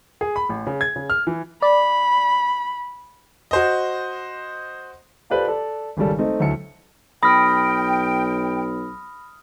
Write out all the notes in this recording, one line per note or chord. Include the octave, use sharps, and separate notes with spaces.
G#4
B5
A1
C#3
G#6
C#3
F6
E3
D5 B5
F#4 C5 D#5
F4 G4 A4 B4 C5 D5
A4 D5
G#1 C#3 G3 A4
A3 C4 D#4 D#5
D2 E3 F#3 A4 C#7
B1 G5 B5 D#6 F6 A#6